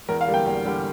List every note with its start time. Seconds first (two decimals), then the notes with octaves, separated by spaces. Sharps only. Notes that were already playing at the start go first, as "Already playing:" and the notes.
0.09 E2 A#4
0.21 F5
0.28 D3 G3 A#3
0.34 G5
0.46 E2
0.65 D3 G3 A#3